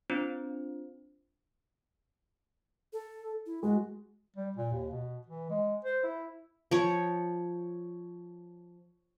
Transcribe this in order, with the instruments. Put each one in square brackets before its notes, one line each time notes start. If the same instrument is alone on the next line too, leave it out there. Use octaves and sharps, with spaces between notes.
[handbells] C4 D4 F4 C5
[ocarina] A4
E4
[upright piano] G#3 [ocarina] F#4
[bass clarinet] G3
A#2
D#2
B2
E3
G#3
C5
E4
[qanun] F3 C#5